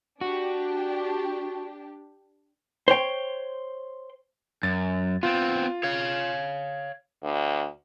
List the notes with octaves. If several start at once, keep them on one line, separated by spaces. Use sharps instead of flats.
D4 F#4 G4
C5 C#5 G5
F#2 A6
B3 C4 F4
C#5 F5
D2